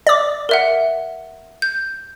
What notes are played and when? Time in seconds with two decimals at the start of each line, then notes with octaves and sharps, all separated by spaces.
0.07 D5 D6
0.49 A#4 E5 F#5
1.62 G6